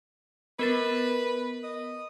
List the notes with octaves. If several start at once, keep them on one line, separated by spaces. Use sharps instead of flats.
B3 A#4 B4 A6
D#5